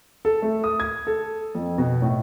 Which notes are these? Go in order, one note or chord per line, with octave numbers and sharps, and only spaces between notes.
A4
A3
D#6
G#6
A4
F2
B2
A2